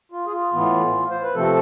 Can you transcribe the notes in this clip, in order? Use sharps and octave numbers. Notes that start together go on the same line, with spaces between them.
F4
G#4
F4
A2 E3 B3
C5
B4
C3 F3 A3 C4 A4